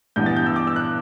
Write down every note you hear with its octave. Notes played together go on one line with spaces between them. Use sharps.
G2 E3 B3 G6
A6
G6
E6
D6
E6
F#6